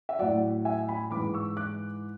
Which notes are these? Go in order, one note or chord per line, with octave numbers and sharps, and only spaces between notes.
E5
A2 F#3 D5 F#5
E5 G#5
G#5 B5
E3 B5 D6
G#2
C#6 E6
D6 F#6